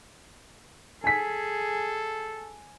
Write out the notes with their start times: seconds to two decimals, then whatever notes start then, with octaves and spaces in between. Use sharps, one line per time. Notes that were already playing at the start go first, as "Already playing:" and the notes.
1.04 G#4 A4 G#5 B6